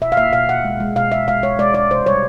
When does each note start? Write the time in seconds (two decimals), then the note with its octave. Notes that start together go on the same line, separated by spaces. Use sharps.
0.02 B2 E5
0.12 F5
0.17 A#3 E5
0.33 B2 F5
0.49 B2 F#5
0.64 G#3
0.80 G#3
0.96 B2 F5
1.11 G#3 E5
1.28 G#3 F5
1.43 G#3 C#5
1.59 G#3 D5
1.74 G#3 D5
1.90 C3 C5
2.06 G3 C#5